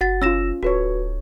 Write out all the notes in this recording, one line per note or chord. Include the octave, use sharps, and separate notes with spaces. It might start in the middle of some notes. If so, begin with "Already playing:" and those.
F#1 F#4 F#5 A6
C#4 F4 E6 A#6 E7
D1 F#4 A4 B4 C#5